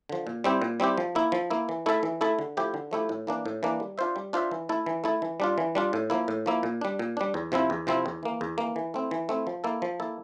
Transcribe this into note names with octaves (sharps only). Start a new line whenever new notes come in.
D3 F3
A#2
G3 C4 E4 G4
A#2
G3 C4 E4 G4
F3
A#3 E4
F3
A#3 E4
E3
A3 E4 A4 E5
E3
A3 E4 A4 E5
D3
F3 A3 E4 G4
D3
F3 A3 E4 G4
A2
E3 A#3 D4
A2
E3 A#3 D4
G3
D4 F4 C5 E5
G3
D4 F4 C5 E5
E3
A3 E4 A4
E3
A3 E4 A4
E3
G3 D4 F4
E3
G3 D4 F4
A2
F3 A#3 E4
A2
F3 A#3 E4
A#2
G3 D4
A#2
G3 D4
E2
C3 F3 C4 E4
E2
C3 F3 C4 E4
E2
E3 A#3
E2
E3 A#3
E3
A3 C4 E4
E3
A3 C4 E4
F3
A#3 E4 A4
F3
A#3 E4 A4